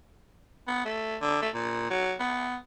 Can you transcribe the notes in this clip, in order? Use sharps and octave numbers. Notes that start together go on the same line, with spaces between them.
B3
A3
D3
A3
A#2
F#3
B3